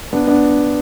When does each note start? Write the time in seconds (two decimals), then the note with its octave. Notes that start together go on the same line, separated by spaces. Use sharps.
0.13 B3 D4
0.27 B3 D4